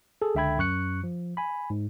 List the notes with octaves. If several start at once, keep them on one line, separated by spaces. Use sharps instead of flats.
G#4 A4
C#2 D3 E5 G5 B5 G#6
F#2 C#6 F#6 C#7
F3
G#5 B5
G#2